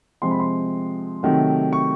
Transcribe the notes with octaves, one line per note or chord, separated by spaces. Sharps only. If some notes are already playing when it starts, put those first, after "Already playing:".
C3 F3 G#3 C4 C6
B5
C6
C3 D#3 F#3 A3
C#6